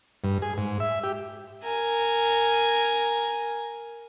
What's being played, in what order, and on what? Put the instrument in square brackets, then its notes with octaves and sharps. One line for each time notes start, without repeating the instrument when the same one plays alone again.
[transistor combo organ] G2
G#4
G#2
E5
G4
[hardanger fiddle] A#4 G#5